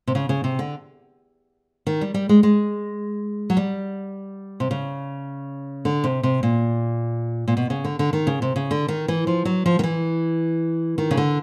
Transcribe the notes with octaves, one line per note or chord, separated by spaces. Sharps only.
C3
C#3
C#3
C3
D3
D#3
G3
G3
G#3
G#3
F#3
G3
C3
C#3
D3
C3
C3
A#2
A#2
B2
C#3
D3
D3
D#3
C#3
C3
C#3
D3
D#3
E3
F3
F#3
F3
D#3
E3
D#3
C#3
D3